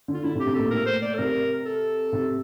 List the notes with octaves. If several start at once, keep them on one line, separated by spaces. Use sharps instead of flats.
D3
F4
D3 E4
C3
G4
C3
A#2 A4
A2 A#4
C5
D5
A4
C3 A#4
A4
C3